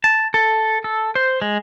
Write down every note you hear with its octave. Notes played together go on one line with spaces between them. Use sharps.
A5
A4
A4
C5
G#3